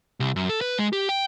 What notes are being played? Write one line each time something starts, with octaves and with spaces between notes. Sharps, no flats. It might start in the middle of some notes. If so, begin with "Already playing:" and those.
C2
F#2
A4
B4
G#3
G4
G5